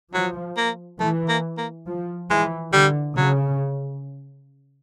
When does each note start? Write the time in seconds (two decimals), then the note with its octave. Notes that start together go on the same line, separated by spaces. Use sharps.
0.13 F3 F#3
0.57 A#3
1.00 E3 A3
1.28 A#3
1.58 A#3
1.87 F3
2.30 E3 G#3
2.73 D3 G3
3.16 C#3 F#3